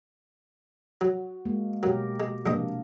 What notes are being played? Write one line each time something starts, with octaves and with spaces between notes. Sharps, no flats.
F#3 F#4
G#3 A#3
B2 F#3 G4 A#4
G#3
A#1 G2 C3 A#3 D4 D#5